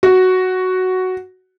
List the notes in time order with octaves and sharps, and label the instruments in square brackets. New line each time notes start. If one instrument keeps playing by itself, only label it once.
[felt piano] F#4